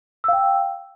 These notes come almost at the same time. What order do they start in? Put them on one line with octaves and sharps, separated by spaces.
E6 F5 G5